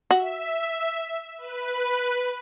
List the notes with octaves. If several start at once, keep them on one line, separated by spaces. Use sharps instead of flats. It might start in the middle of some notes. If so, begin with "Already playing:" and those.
F#4 E5
B4